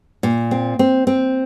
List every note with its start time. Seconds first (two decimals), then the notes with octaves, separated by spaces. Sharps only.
0.23 A#2
0.51 C4
0.79 C4
1.07 C4